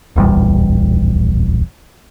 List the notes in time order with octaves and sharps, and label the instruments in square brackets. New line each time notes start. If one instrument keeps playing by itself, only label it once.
[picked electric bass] D1 A#1 E2 G3